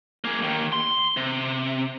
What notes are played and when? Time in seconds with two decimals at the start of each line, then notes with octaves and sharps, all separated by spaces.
0.24 A#3 G#4
0.42 D#2 D#3
0.73 C6
1.17 C3